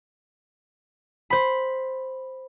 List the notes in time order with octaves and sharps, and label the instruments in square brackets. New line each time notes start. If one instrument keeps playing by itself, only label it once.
[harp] C5 B5